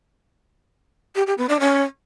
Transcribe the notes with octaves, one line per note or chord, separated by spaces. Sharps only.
G4
G4
B3
D4
C#4